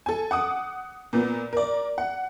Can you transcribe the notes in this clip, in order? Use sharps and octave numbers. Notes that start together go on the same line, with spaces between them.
A4 G#5
F#5 D6 D#6
A#2 B3
A#4 D5
F#5